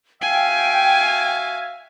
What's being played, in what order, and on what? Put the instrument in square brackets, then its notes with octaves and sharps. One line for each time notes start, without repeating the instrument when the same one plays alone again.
[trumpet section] F#4 E5 F5 [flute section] G5 [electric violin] G#5